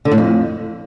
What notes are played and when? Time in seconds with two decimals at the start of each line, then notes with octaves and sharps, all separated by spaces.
0.05 D3
0.11 A2
0.18 F2